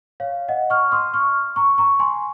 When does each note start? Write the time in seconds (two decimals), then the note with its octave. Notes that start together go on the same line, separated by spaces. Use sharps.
0.20 C#5 F5
0.48 D#5 F#5
0.70 C#6 F6
0.92 C6 D#6
1.14 C#6 F6
1.56 A#5 C#6
1.78 A#5 C#6
1.99 G#5 C6